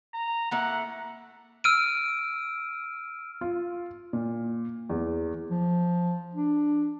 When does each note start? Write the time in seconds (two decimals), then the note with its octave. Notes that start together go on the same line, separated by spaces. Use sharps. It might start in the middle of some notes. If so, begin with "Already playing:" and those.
0.14 A#5
0.51 A3 A#3 E4 F#5
1.64 E6 F6 D7 D#7
3.41 F4
4.13 A#2
4.89 E2
5.50 F3
6.35 D4